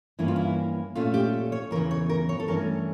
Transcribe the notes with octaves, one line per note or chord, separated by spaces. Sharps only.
G2 E3 A#3 C#4 E4
F4
E4
A#2 A3 C#4 F4
G4
C#5
E2 C#3 E3 A#4
C#5
A#4
C#5
A4
G2 E3 A3 C#4 A#4